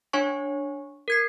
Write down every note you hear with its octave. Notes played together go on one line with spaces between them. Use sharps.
D4 C#5 G#5 C#6
A#4 G#6 C7